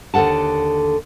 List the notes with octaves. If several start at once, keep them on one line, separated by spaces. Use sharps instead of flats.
D#2 D3 A4 F#5 A5